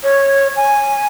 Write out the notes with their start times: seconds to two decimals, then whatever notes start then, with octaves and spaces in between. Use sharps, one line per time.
0.03 C#5
0.56 G#5